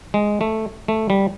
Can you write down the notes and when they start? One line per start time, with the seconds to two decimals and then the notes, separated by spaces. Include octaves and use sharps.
0.14 G#3
0.41 A3
0.88 A3
1.10 G3